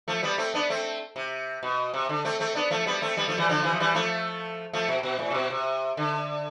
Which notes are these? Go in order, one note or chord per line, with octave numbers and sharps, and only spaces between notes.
F3 A3
G3 B3
A3 C4
B3 D4
A3 C4
C3
B2
C3
D3
A3 C4
A3 C4
B3 D4
F3 A3
G3 B3
A3 C4
G3 B3
F3 A3
E3 G3
D3 F3
C3 E3
F3
E3 G3
F3 A3
F3 A3
B2
B2
A2
C3
B2
C3
D3